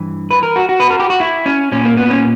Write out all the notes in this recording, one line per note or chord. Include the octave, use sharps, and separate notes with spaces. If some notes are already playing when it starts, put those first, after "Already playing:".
Already playing: G2 E3
B4
A#4
F#4
F#4
B4
A#4
G4
F#4
E4
C#4
A#2 C#4
A#3
B3
C#4